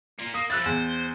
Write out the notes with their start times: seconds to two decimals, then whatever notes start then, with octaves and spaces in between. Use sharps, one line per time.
0.19 A#3 F4
0.34 A#3 D#6
0.50 F3 E4 E6 F#6 A6
0.66 E2 C5